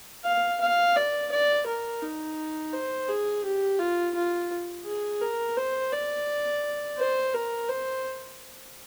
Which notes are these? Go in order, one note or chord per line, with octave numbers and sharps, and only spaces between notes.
F5
F5
D5
D5
A#4
D#4
C5
G#4
G4
F4
F4
G#4
A#4
C5
D5
C5
A#4
C5